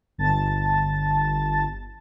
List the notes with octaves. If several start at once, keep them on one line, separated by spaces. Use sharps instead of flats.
G1 A5 A6